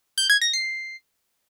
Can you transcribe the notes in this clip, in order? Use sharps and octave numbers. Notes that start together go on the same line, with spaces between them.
G6
G#6
A#6
C7